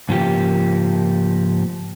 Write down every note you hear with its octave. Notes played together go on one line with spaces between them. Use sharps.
G#2 C#3 F3 A#3 G4